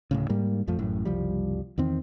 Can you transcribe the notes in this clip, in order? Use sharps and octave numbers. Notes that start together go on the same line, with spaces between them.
D1 A2 C#3
G#2 G3 A#3
A#1 F2 F3 A3
A1 F#2 A2
F#1 C2 F3 G3
E2 D#3 C4